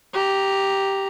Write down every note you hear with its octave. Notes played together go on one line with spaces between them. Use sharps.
G4 A#5